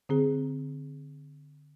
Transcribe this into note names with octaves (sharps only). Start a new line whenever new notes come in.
D3 C4 G#4